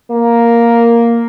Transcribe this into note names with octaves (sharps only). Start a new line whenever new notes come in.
A#3